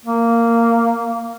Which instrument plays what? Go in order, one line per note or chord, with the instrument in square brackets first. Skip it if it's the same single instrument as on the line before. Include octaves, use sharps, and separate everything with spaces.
[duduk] A#3